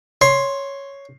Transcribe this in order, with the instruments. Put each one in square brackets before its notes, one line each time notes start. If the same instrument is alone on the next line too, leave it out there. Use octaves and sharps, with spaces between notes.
[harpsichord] C#5 [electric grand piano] C6 C7